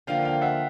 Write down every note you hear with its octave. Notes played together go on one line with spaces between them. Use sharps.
D3 F3 A#3 F5 G5
F5 G5
E5 F#5